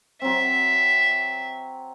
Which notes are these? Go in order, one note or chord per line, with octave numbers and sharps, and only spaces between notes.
F#3 C4 E5